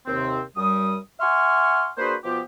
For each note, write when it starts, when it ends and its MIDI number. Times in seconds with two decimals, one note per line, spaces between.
0.06 0.41 39
0.06 0.41 48
0.06 0.41 60
0.56 0.97 42
0.56 0.97 55
0.56 0.97 87
1.20 1.89 76
1.20 1.89 78
1.20 1.89 80
1.20 1.89 84
1.20 1.89 85
1.20 1.89 89
1.98 2.15 58
1.98 2.15 62
1.98 2.15 66
1.98 2.15 68
1.98 2.15 71
1.98 2.15 72
2.24 2.41 47
2.24 2.41 53
2.24 2.41 59
2.24 2.41 65
2.24 2.41 67